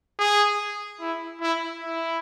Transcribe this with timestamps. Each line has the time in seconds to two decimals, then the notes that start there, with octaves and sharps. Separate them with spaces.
0.19 G#4
1.00 E4
1.41 E4
1.81 E4